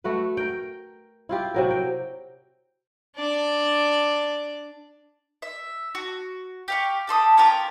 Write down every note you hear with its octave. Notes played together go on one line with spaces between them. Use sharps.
A3 F#4 B4
A#4 G5
E4 F4 G4
C3 F#3 A#4
G5
D4 D5
E5
F#4
G4 F5 C#6
G4 A4 C6 D#6
C#4 F4 G4 A#4